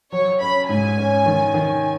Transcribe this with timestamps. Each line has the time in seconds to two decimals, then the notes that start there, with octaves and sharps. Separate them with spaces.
0.12 F#3 C#5
0.40 C#4 B5
0.69 G#2 G#5
0.98 C#4
1.26 D#3
1.54 D#3